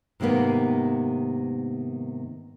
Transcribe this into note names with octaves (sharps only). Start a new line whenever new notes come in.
G#2 C3 D#3 A#3 B3